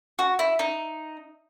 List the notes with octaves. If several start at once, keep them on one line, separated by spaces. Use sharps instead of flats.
F#4
E4
D#4